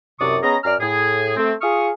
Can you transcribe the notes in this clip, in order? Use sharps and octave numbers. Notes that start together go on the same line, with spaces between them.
C2 F#2 C3 D5 C#6 D#6
B3 C#4 G#4 D#5 A#5
F#2 D5 A#5 F6
A2 G#4
A3 C4
F4 G#4 C#6 D#6 F6